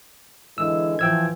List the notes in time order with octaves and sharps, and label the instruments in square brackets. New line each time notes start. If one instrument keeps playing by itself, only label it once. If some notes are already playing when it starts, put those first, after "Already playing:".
[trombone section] D3 E3 G#3 [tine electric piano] E6
[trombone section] E3 F3 [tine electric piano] G5 E6 G#6